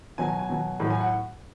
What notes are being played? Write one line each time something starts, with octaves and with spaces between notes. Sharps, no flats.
B2 F#3 G#5
G#5
G#5
B2 F#3
A2 F#3
G#5
F#5